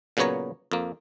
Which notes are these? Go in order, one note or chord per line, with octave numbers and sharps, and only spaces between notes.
A#2 C#3 F#3 B3 C#5 A#5
F2 A#3